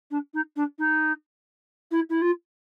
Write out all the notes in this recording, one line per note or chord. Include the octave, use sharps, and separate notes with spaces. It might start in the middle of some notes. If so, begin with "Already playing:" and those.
D4
D#4
D4
D#4
E4
E4
F4